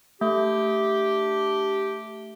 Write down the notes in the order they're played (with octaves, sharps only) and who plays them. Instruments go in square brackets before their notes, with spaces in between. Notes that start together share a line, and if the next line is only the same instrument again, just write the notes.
[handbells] A3 [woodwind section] D4 G4